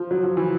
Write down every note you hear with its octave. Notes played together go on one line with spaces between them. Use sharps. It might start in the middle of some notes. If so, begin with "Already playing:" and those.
Already playing: F3
F#3
F3
E3